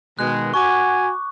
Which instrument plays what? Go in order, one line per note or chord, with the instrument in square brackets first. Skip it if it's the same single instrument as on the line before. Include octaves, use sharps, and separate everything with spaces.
[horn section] B2 D#3 G#3 [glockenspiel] F#6
[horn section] F#4 G#5 [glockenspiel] C#6 D6